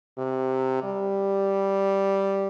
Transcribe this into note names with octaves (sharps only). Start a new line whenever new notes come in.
C3
G3